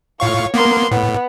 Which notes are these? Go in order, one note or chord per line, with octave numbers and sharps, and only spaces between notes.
A2 F4 C#5 F5 C#6
A#3 B3 A#4 C6
A2 B3